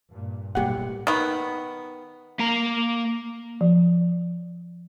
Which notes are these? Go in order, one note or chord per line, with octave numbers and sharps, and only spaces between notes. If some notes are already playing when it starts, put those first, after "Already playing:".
G2 A#2
B1 A2 G3 A#3 G4 F#5
D#3 B3
A#3 A#5
F3